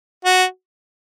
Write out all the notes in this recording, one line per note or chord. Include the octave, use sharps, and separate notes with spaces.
F#4